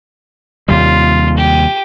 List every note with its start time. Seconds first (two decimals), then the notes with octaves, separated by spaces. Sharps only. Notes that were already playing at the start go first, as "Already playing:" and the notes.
0.68 D#2 C3 G3 F4
1.38 G4